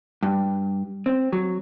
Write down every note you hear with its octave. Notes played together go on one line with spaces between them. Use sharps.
G2
C4
F#3